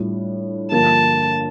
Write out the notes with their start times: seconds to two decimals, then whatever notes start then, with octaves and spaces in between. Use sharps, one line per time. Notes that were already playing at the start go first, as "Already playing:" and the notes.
Already playing: A2 G3 D4 F4
0.72 G2 D3 F3 A#3 A5